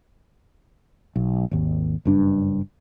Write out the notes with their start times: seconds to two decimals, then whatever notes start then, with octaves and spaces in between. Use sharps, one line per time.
1.16 B1
1.51 G#1 D#2
2.05 F#1 G2 D4